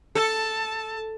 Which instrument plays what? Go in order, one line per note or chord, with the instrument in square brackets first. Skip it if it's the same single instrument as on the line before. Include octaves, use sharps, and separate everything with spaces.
[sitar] A4 [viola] A5